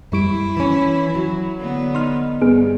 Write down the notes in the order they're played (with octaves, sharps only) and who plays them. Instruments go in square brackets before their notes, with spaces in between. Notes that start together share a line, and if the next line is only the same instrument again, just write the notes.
[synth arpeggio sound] F#2 G3 D7 [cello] E4
[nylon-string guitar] E3 C#4
F#3
[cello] D3 B3
[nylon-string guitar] D#4 [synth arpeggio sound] C6 F6
[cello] G2 [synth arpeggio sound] B3 G#4